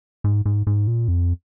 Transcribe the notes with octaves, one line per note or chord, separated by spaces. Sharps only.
G#2
G#2
G#2
A#2
F2